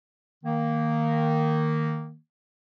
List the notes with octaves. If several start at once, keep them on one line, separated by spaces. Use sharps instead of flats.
D#3 A#3